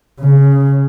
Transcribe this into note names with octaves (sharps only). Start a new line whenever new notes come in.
C#3